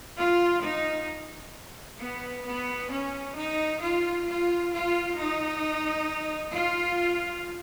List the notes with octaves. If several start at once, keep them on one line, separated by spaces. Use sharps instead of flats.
F4
D#4
B3
B3
C#4
D#4
F4
F4
F4
D#4
F4